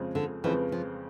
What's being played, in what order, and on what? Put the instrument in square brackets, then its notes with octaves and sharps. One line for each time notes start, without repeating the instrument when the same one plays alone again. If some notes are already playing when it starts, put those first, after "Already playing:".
Already playing: [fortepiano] F2 C#3 F3 G#3 C4
[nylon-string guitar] D3
[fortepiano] F2 C#3 F3 G#3 C4 [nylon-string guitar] E3
[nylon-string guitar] F3